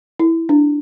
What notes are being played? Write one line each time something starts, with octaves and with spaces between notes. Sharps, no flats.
E4
D4